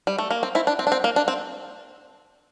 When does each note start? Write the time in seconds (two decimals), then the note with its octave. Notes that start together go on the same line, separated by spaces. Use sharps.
0.07 G3
0.18 A3
0.31 A#3
0.43 C4
0.55 C4 E4
0.67 D4
0.79 C4
0.87 D4
0.92 C4
1.04 A#3
1.16 D4
1.28 C4